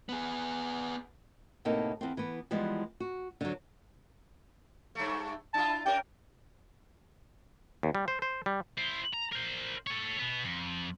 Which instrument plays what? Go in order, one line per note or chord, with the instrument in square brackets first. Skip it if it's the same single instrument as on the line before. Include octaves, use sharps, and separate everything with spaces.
[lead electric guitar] B3 G#4
[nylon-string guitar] A2 C3 A#3 B3 D#4 A4
E2 C4
E3 B3
E3 F3 G3 G#3 B3
F#4
D3 F#3
[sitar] G2 A3
[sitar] D4 E4 F4 [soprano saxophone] A5
[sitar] C#4 A#4 [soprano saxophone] G5
[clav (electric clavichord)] D#2
G3
C5
C5
G3
[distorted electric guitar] E4 C5
A#5
A#4 C5
A4 C#5
B2 B3
F2